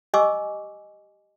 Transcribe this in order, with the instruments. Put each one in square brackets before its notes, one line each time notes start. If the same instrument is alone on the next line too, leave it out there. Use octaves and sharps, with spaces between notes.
[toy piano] G4 D#5 G#5 C#6 D6 E6